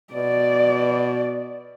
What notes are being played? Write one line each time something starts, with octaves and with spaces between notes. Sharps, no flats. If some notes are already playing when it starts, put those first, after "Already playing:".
B2 D5